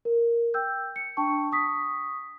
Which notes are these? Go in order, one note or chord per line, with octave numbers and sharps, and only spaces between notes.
A#4
G5 E6 G6
C#7
D4 G5 A5 C#6
C#6 D#6 B6